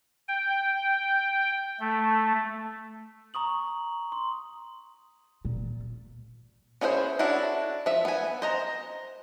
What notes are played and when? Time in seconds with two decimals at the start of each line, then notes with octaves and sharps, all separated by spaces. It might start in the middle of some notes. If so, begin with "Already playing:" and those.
0.28 G5
1.80 A3
3.34 A#5 C#6 D#6 F#7
4.12 C6
5.45 A#2
6.81 C#4 E4 G#4 A#4 C5
7.19 C#4 D4 E4 F#4 A4
7.86 F3 E5
8.05 B3 G#5
8.42 C5 D#5 A#5